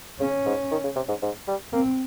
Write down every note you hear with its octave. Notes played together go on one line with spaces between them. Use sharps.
C#3 C#4
G#2
D#3
C#3
C3
G#2
G#2
G3
A#3 C4